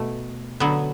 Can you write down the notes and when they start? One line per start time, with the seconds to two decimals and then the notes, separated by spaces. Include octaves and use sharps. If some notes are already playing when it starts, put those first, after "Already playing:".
Already playing: B2 A3
0.60 D3 F#3 B3